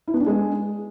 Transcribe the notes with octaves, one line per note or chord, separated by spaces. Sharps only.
E4
B3
D4
G#3